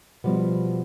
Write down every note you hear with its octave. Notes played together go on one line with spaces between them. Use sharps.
B2 F3 G3 B3